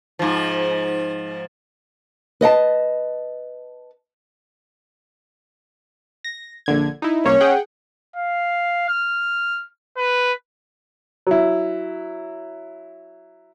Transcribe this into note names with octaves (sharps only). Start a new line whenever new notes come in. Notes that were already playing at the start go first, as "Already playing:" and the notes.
G#2 F3
B4 D#5 F#5 A5
A#6
A#1 D3 G#6
D#4 E4
C2 A#3 C#4 C#5
G#4 F#5 G5
F5
F6
B4
F#3 E4